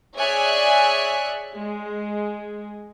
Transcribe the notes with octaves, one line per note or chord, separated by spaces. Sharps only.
G#4 C#5 D5 E5 G#5 F#6
G#3